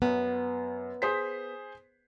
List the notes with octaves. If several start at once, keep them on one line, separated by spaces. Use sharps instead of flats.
F#2 B3
G#4 C5 B6